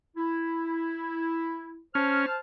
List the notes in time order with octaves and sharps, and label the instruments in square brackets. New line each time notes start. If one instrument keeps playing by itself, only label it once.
[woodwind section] E4
[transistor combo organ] C#4 [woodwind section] C5 A5 F6